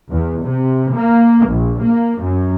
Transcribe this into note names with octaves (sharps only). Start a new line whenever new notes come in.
E2
C3
A#3
A#1
A#3
F#2